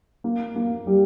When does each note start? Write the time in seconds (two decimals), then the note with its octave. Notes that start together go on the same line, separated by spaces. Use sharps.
0.24 A#3
0.56 A#3
0.87 G3